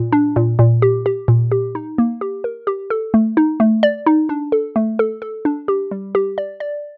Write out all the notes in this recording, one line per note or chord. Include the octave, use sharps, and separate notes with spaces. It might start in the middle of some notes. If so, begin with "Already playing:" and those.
Already playing: A#2
D4
A#2
A#2
G4
G4
A#2
G4
D#4
A#3
G4
A#4
G4
A4
A3
D#4
A3
D5
D#4
D4
A4
A3
A4
A4
D4
G4
G3
G4
D5
D5